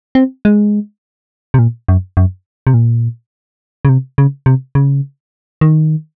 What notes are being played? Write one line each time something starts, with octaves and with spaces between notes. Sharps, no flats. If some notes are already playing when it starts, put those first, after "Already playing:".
C4
G#3
C3
A#2
F#2
F#2
C3
A#2
C#3
C3
C#3
C3
C#3
D#3